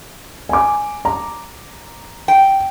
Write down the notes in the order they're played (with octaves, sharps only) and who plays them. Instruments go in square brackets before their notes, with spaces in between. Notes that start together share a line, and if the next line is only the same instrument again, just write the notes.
[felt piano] G#5 D6
A#5
[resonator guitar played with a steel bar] G5